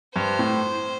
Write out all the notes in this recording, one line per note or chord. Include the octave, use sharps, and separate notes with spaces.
G2 C5
A2